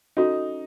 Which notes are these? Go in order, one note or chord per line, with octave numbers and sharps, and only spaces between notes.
C#4 D#4 F#4 A4